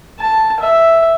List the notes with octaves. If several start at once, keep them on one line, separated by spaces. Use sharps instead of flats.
A5
E5